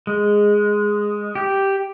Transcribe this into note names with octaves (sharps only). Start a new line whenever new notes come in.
G#3
G4